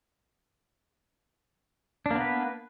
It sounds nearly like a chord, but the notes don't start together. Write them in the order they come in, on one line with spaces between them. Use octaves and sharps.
D4 A#3 B3 B4